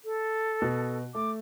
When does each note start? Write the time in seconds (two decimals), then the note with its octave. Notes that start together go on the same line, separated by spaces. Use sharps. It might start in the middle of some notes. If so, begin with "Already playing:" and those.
0.05 A4
0.62 B2
1.15 A3 D6